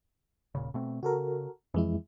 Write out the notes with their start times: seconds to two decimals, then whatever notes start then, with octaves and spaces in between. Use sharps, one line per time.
0.55 D#1 A#2 C#3
0.74 B2 A3 C4
1.03 C#3 F#4 A4 A#4
1.74 F2 E3 G#3 E4